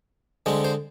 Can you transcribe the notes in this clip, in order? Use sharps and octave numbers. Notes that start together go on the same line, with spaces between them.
D3 G#3 C4
C5